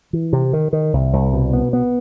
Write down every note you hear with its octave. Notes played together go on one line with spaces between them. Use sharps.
E3
C3
D#3
D#3
C2
C2
B2
B3
B3